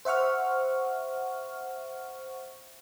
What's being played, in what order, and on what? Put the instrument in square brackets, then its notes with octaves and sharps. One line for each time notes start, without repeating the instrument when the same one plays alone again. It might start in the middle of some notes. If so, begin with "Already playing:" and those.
[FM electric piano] C5 E5 F#5 C#6 F6